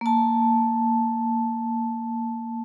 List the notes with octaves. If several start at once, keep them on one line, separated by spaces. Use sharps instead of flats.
A#3 A5